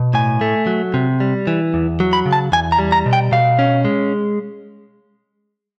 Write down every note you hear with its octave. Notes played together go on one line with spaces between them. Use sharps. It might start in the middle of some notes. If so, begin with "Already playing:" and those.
Already playing: B2
A2 G#5
A3
F#3
C3
G3
E3
E2
F#3
B5
C#3
A5
E2 G#5
A#5
G3
A#5
B2
G5
B2 F5
C#4
G#3